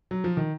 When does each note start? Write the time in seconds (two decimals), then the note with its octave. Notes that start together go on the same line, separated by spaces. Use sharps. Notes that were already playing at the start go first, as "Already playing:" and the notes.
0.11 F#3
0.24 F3
0.37 D#3